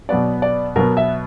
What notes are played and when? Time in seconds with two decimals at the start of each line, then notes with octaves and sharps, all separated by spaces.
0.09 B2 F#3 B3 D5
0.42 D5
0.76 B2 F#3 B3 A#4
0.97 E5